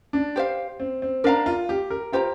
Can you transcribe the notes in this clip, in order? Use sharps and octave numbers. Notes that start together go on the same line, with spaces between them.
D4
G4 C5 F5
C4
C4
D4 A#4 F5 A#5
F4
G4
A#4
F4 G4 C5 A#5